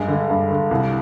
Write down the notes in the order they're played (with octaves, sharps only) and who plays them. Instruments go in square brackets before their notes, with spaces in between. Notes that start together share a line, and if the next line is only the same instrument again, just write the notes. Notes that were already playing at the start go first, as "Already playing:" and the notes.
Already playing: [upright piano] G2 G#3
D3
G2
D3
C2